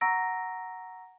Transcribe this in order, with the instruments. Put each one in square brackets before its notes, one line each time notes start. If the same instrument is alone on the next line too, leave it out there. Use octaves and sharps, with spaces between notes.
[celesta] F#5 A#5 C#6 E6 A#6 D7